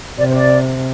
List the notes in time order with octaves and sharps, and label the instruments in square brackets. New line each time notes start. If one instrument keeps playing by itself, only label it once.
[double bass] C3 [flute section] D5
[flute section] C5
D5